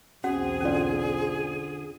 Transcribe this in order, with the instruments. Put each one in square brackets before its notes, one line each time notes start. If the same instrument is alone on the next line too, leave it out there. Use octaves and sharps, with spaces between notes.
[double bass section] B1 E2 C4 [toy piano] C#4 F#4 F#5 [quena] G#4
[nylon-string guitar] D3 F4 [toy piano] C#4 D5